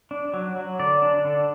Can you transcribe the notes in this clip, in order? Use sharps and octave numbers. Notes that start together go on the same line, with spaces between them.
D4
F#3
F#3
D3 D5
D4
D3